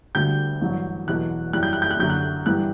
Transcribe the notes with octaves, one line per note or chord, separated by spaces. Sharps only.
D2 D3 G3 G6
A1 G2 F#3
E2 B2 F#3 B3 F#6
F#2 E3 G3 F#6
G6
F#6
G6
F#6
F#2 D3 F#3 G6
F#6
G2 E3 G3 B3 F#6